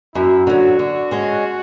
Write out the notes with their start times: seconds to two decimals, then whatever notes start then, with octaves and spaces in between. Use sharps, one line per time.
0.15 F#2 E4
0.47 D3 F#3 F#4
0.79 D3
1.11 G#3 C#4